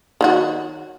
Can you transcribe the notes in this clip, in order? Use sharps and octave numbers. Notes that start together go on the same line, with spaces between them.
D#3 F#3 F#4